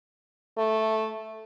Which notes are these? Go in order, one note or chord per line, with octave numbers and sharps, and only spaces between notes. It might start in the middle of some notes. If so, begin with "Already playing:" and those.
A3